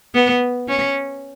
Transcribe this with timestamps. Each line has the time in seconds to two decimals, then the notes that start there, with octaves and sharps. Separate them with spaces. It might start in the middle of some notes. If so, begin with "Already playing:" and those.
0.15 B3
0.68 C#4